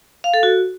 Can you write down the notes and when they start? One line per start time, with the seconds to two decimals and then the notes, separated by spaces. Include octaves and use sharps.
0.24 F5
0.34 A4
0.43 F#4